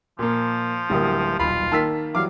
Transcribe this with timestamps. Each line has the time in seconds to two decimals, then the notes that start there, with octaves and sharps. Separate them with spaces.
0.19 A#2 F3 A#3
0.90 D1 D2 G3 A#3 D#6
1.40 D#1 B1 F4 B5
1.72 D#3 A#3 A5 E6 B6
2.15 E3 F#3 G3 F5 D6